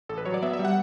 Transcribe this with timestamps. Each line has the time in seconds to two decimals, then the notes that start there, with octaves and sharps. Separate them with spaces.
0.09 A1 A4
0.18 B4
0.25 F#3 C#5
0.34 D5
0.43 B3 E5
0.53 E5
0.59 G3
0.65 F#5